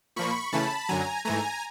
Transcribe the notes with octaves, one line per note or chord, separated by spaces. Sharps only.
A#2 F3 A#3 B5 C#6
C#3 E3 A3 C#4 A5 B5
F#2 D3 F#3 G#5 A#5
G#2 E3 A3 G#5 A#5